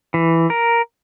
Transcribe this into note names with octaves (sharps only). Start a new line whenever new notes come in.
E3
A#4